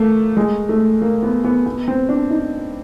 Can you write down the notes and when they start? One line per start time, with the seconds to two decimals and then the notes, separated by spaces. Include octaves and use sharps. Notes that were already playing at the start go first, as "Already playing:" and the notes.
Already playing: A3 A#3
0.37 G#3
0.69 A3
1.02 A#3
1.23 B3
1.44 B3
1.66 B3
1.88 C4
2.09 D4
2.30 D#4